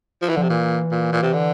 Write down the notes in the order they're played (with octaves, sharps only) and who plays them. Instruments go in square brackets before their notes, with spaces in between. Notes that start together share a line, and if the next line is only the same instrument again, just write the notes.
[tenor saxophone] F3
E3
[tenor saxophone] D3 [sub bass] F3
[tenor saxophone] C3
[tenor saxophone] A#2 [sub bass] E3
[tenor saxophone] A#2
A#2
C3
D3